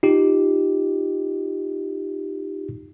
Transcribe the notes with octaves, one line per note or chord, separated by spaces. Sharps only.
D#4 F4 G4